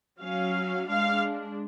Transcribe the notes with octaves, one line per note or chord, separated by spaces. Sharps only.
F#3 C#4 F5
G#3 D4 F5